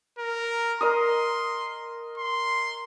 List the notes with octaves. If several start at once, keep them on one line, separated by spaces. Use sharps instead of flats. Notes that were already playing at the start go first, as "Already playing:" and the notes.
A#4
A#4 D#5 C6 D#6
C6